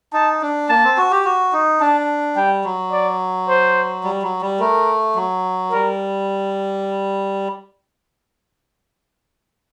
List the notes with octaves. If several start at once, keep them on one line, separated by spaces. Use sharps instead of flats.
D#4 A5
D4
A#3 A5
C4
F#4
G4
F#4
D#4
D4 A5
G3 G5
F#3
D5
C5
G3
F#3
G3
A3 A#4
F#3
G3 A#4